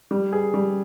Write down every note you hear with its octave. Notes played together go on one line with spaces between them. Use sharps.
G3
G#4
G3